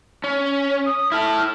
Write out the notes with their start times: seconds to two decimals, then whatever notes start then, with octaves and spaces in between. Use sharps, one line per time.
0.24 C#4
0.86 D#6
1.12 E4 A4 F6